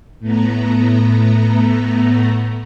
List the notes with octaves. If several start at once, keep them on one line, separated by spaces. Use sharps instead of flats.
A2 A3 B3 A#5